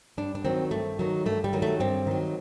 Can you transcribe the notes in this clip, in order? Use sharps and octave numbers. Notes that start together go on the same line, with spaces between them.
G2 D4
D4
D#3 F#3 C4
G2 A3
D#3 F#3
G2 A3
G3
D#3 F#3
A3
G2 C4
D#3 F#3